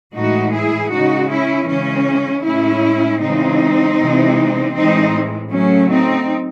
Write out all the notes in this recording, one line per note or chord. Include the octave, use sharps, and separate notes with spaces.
A2 E3 G#3 D#4 F#4
E4 G#4
C#3 G#3 D#4 F#4
C#4 E4
C#3 E3 G#3 C#4
A2 G#3 C#4 E4
C#3 E3 G#3 C4 D#4
C3 E3 G#3
A2 E3 G#3 C4 D#4
C#3 F#3 A3 C#4
C4 D#4